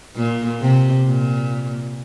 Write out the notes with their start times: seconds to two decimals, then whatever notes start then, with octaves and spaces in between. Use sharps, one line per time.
0.16 A#2
0.61 C3
1.07 A#2